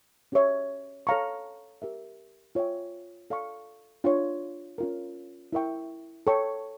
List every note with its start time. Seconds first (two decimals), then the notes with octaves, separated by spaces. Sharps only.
0.32 C#4 G4 C#5 E5
1.07 A4 C#5 F5 A#5 C#6
1.82 G4 A#4 E5
2.55 F4 C#5 E5 G5
3.30 A4 D5 F5 C#6
4.04 D4 F4 C#5
4.78 C#4 F4 A#4
5.53 E4 A#4 E5 G5 C#6
6.27 A4 C#5 G5 C#6